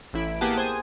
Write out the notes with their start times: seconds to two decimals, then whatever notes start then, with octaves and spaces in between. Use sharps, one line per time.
0.13 A1 E4 D7
0.41 A#3 B3 G4 G#4 F#5 A5
0.56 G#4 C5 G#5 D#6